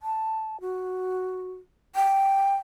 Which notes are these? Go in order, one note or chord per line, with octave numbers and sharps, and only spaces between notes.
A5
F#4
G5